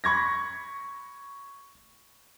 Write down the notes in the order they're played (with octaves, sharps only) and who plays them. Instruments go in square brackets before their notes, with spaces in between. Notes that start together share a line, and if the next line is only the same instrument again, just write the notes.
[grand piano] B5 C#6 G#6 A#6